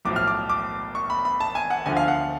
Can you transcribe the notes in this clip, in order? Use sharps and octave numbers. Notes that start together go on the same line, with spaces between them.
B1 A2 F3 D6
F6
D6
D6
C#6
B5
B5
A5
G#5
F#5
D2 D3 F3 G#5
F5
F#5